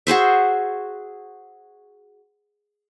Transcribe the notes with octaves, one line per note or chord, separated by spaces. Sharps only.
F#4 G#4 C5 E5